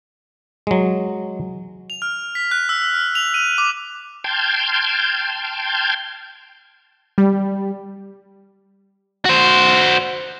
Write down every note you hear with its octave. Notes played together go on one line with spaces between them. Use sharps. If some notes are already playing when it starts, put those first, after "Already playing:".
F#3 G#3
F7
F6
B6
F#6
E6
F6
F7
D#7
D6
G5 A5 C6 F6 G6 G#6
G3
F#4 C5